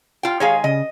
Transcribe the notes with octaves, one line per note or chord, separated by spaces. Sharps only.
F4 G5
D#3 G#3 G#4 C#5 F5
C#3 D#5